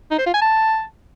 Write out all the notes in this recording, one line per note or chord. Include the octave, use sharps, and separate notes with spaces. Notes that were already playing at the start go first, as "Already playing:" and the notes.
D#4
C5
F4
G#5
A5